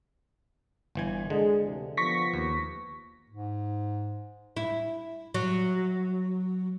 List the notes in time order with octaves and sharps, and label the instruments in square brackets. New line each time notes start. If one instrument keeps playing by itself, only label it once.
[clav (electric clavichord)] G1 E3 G#5
[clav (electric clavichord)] D3 [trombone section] G#3
[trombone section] D2 C3 E3
[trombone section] F3 B3 [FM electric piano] C#6 A#6 B6
[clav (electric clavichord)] D#2
[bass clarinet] G#2
[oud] E4
F#3